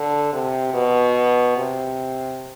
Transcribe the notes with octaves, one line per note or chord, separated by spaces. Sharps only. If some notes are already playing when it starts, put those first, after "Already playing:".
Already playing: D3
C3
B2
C3